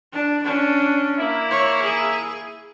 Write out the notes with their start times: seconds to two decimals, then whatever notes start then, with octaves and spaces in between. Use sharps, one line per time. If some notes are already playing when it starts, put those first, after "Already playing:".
0.13 D4
0.43 C#4 D4
1.18 A#3 E4
1.51 C#5
1.83 G#4